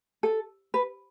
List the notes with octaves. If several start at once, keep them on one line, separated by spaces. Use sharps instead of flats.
A4
B4